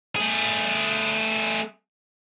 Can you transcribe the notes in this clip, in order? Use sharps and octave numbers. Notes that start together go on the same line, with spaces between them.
A3 G#4